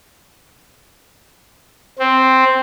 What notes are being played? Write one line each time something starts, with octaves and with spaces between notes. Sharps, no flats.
C4